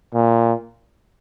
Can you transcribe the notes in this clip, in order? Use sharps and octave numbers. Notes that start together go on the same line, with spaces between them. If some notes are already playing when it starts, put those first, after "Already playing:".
A#2